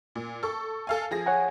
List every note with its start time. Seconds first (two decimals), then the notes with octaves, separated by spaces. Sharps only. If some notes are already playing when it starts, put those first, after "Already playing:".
0.16 A#2
0.43 A4 C#6
0.87 A4 F5 G#5
1.11 F3 G#4 A#6
1.26 C#5 F#5 G#5